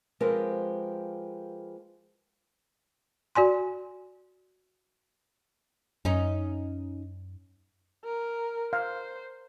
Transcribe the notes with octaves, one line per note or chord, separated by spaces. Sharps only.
F3 G#3 C4 G4 A#4 B4
F#4 D5 G#5 C6
F#2 C#4 D#4
A#4
C5 F5